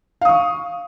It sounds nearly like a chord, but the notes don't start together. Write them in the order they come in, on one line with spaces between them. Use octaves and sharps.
F5 D#6 C#6